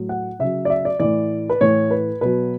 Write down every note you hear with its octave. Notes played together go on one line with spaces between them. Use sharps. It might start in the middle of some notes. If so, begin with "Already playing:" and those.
Already playing: A2 F#3
F#5
C#3 F#3 E5
D5
E5
D5
A2 E3 D5
B4
A2 E3 C#5
B4
B2 F#3 B4